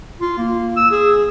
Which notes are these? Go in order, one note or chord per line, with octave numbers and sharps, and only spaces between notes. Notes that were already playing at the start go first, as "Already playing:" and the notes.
F4
A#3
E6
G#4